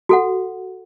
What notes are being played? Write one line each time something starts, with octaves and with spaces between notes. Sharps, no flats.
F#4 A4 F#5